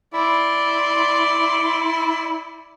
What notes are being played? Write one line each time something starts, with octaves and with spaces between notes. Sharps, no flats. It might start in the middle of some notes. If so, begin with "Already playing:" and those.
E4 D5 C6